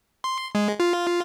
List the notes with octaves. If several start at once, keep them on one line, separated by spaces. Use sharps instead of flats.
C6
G#3
F4